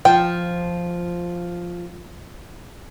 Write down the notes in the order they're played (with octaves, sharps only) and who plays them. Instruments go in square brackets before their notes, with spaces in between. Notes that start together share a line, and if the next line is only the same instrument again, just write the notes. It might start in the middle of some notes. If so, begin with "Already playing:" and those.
[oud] F3 [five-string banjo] G5